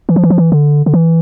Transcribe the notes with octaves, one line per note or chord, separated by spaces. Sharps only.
E3
F3
E3
F3
E3
D3
D3
E3